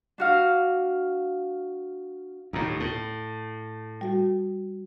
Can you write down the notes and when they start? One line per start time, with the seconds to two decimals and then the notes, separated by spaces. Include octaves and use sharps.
0.18 D4 F#4 F5
2.53 D#2 A2 A#5
2.80 A2
4.01 G3 F#4